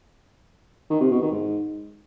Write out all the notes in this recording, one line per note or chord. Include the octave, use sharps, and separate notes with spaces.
D#3
C3
B2
D#3
G#2